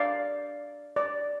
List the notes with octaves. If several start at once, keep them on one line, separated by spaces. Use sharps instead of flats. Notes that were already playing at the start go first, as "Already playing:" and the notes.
Already playing: D4 D5 F5
D5